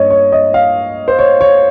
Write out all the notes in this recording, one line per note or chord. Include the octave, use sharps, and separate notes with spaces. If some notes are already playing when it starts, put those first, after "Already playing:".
Already playing: G2 A#3 C#4 C#5 D#5
C#5
D#5
F5
C5
C#5
C#5